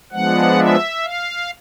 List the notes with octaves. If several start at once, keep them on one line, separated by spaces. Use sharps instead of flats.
F3 G#3 B3 D4 F#5
E5
F5